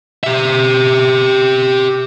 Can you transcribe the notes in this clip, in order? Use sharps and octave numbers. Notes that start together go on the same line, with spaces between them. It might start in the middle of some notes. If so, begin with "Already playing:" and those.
G4 E5